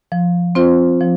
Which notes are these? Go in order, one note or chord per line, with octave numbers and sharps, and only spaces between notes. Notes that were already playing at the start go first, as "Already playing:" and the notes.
F3
C4 F4 C5
F3